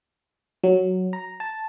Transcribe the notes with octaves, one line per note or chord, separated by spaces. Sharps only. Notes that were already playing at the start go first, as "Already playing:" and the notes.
F#3
A#5
A5